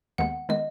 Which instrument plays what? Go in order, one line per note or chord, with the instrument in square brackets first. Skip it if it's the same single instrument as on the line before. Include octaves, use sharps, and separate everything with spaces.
[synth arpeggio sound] D#2 D#3 G#3 B3 [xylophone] F#5
[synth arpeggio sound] D#3 G#3 B3 [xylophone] D#5